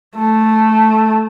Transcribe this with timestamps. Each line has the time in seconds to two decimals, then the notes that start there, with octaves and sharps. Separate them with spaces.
0.16 A3